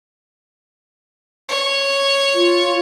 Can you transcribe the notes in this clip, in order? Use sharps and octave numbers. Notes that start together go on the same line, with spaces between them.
C#5
F4